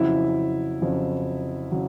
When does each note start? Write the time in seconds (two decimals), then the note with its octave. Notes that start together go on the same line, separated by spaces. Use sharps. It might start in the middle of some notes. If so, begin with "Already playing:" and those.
Already playing: F2 C#3 F#3 E4
0.82 F2 C#3 F#3
1.72 C#3 F#3